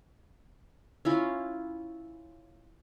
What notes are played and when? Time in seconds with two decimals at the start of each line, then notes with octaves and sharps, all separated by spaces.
1.05 C#4 E4 F4